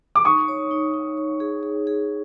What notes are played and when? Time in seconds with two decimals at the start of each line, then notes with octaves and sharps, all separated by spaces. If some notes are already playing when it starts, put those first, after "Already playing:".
0.15 D6
0.25 D#4 C#6 D#6
0.48 C#5
0.71 D#4
0.94 D#4
1.17 C#5
1.40 G#4
1.63 G#4
1.87 G#4